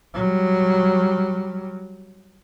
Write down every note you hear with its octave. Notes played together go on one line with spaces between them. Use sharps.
F#3 G3